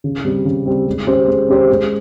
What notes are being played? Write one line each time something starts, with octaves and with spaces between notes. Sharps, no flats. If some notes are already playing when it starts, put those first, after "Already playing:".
C#3
G3 C4
C#3
G3 C4
G#3
C#4 G4 C5
G#3
C#4 G4 C5
G#3